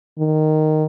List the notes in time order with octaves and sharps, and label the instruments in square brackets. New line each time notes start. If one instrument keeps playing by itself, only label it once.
[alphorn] D#3